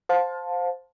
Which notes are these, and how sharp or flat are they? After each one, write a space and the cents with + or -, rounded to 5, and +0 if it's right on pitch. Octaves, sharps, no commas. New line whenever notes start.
C5 +0 F5 +30 A5 +0